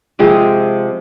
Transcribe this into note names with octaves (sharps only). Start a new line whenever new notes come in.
C3 F3 G#3 C4 G#4